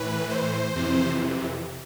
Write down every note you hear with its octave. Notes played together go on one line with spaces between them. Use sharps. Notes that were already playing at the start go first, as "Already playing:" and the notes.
Already playing: A2 E3 B4
C5
F2 C3 E3